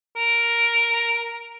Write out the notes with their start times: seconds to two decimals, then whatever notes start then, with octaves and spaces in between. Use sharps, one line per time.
0.16 A#4